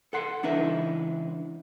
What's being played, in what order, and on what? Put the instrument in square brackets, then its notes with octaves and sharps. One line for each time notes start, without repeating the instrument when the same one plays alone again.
[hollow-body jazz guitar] A4 F#5 C6
C#2 E3 D4 D#4 B4 E5